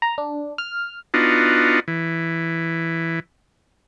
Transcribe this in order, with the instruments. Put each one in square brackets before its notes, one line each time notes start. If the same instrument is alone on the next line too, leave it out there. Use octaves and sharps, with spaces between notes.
[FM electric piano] A#5
D4
F6
[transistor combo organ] B3 D4 D#4 F4 F#4
E3